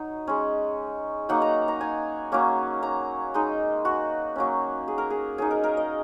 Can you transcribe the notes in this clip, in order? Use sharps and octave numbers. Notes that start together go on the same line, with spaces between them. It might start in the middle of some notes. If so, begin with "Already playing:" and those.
Already playing: F#3 D#4
G#3 C#4
F#3 A#3 D#4 F#5
A#5
A#5
G#5
F#3 A#3 C#4
A#5
G#3 D#4
F#4
F#3 A#3 C#4
G#4
A#4
G#4
F#3 D#4 G#4
A#4
A#4
D#5